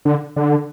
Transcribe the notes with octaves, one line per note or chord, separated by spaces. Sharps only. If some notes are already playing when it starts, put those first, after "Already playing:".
D3
D3